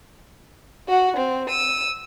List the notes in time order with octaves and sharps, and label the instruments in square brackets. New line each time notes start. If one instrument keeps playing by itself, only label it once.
[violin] F#4 F#5
C4
E6 D#7